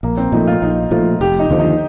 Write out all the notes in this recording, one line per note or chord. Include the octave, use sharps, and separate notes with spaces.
A#1 A#3
C4
A#2 F3 A3 D#4
F4
A#1 D#4
A#2 F3 A3 F4
F1 G4
D#4
D#2 D3 F3
D#4